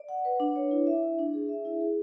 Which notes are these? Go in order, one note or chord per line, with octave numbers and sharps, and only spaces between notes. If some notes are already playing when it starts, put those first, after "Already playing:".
Already playing: D5
F#5
B4
D4
C#5
E4
E5
E4
D4
G#4
E5
E4
G#4